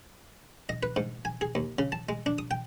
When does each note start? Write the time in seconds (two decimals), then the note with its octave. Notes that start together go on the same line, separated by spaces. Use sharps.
0.69 D#5
0.83 B4
0.96 G#2
1.25 G#5
1.41 G#4
1.55 D#2
1.79 C#3
1.92 A5
2.09 G#3
2.26 D4
2.38 D#6
2.51 G5